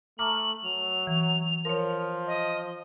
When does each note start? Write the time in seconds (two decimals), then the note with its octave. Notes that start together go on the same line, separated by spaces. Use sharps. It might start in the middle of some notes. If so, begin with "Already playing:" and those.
0.19 A3 A#5 D6 F6 F#7
0.64 F#3 F7
1.07 E3
1.65 F3 A#4 C#5
2.27 D#5